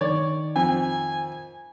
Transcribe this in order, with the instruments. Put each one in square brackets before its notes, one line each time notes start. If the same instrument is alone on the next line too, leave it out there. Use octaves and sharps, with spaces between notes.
[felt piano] D#3 [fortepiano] C#5 D5
[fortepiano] F2 [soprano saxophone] G#5